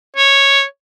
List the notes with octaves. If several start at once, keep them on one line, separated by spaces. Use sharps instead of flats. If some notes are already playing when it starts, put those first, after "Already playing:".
C#5